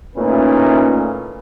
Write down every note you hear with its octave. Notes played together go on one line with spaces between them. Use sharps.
A#2 A3 C#4 D#4 E4 B4